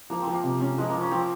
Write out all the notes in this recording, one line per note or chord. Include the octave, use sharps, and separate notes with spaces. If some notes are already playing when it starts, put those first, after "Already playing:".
F3 A#3
C4
F3
A#3
C3
C#4
F3 G#3
F3 A#3
C#4
F3 C4